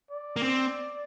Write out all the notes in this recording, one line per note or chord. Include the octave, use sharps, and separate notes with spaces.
D5
A#3
C4